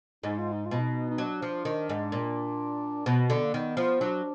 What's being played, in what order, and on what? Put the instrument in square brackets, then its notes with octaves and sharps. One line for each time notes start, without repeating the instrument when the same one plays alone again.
[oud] G#2 [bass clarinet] D#4
[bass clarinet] F4
D#4
F4
[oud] B2
[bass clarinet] D#4
D#4
[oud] F#3 [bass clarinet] D4
[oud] F3
D#3
G#2
A#2
[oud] B2 [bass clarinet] B3
[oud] D3
[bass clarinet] A#3
[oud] D#3 [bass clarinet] B3
[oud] F3
[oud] F#3 [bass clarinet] D4